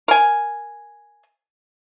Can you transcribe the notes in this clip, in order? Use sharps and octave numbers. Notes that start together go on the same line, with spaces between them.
A#4 G#5